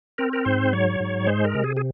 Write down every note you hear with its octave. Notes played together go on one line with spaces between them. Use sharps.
C4 A#4
A#4
G#2 C5
F#3 C#5
G#2
G#3 C5
A#4
C3
G#4
G#4